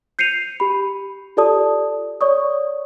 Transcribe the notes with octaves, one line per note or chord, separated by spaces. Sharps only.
G6 C7 C#7 D#7 F7
G4 B5
F4 G4 A4 D5 A5 D#6
C#5 D5 C#6 D#6